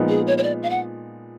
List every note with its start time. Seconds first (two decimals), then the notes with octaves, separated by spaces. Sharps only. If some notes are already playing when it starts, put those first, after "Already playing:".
Already playing: A#2 F3 G#3 B3 D#4
0.09 G#4
0.27 C#5
0.38 C#5
0.43 D5
0.63 F5
0.70 F#5